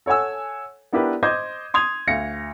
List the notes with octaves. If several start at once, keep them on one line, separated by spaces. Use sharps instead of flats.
A4 C#5 F#5 G#5 E6
B3 D4 E4 G4 A#4 B4
C5 D#5 D6 G6 G#6
C6 D#6 G#6 F7
D2 F5 A#6 C#7